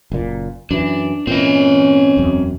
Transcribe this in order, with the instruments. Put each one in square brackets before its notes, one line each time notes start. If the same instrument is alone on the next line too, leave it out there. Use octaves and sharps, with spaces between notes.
[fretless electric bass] F#1 A#2
[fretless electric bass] F#2 E3 [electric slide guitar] D4
[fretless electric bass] A#2 E3 [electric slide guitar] C4 D#5 [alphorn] C#4
[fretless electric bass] E1 F#2